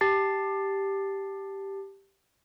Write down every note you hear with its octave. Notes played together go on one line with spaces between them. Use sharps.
G4 A5 A6 C7